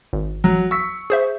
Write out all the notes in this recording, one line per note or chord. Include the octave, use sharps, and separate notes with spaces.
G#1
F#3
C#6 E6 B6
G#4 C5 E5